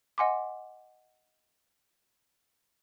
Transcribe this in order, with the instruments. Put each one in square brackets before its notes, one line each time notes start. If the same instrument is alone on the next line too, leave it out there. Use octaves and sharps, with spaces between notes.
[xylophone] D#5 F#5 G#5 C6 D6